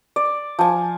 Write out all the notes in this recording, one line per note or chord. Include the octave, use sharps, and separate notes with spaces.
D5
F3 G#5